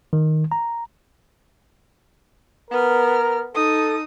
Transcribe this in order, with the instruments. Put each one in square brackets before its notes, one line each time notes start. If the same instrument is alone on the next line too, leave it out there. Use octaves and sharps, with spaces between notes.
[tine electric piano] D#3
A#5
[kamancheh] B3 F6 [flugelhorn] A#4
[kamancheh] D#4 D#6 [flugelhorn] A4